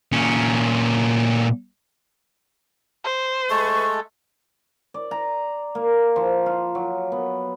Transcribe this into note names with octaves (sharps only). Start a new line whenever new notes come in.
A#2 C#4
C5
G#3 A3 A4 C#6
D5
A#5
A#3
F3
F4
F#3
B3